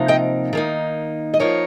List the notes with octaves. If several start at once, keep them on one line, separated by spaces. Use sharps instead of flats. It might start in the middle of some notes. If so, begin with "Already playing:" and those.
Already playing: C3 F3 A#3 D#4
D#5 G5
D#3 A#3 D#4
D#5
F3 A#3 D#4 A#4 C#5